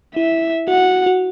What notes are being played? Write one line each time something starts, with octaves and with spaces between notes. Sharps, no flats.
E4 E5
F#4 F#5
F#4